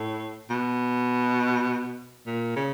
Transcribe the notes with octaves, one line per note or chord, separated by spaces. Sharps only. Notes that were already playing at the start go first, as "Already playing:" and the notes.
Already playing: A2
B2
A#2
C#3